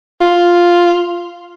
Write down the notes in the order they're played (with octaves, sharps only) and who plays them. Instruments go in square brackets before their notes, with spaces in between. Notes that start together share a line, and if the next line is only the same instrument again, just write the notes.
[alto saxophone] F4